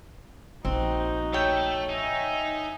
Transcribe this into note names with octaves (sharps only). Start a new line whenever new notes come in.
A#1 C4 D#4 F#4
A3 A4 C#5 G5
D#4 E5 G#5